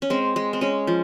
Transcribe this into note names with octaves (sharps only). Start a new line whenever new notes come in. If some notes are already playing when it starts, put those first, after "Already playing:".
C#4
G#3 C4
G#3
C4
G#3 C#4
F3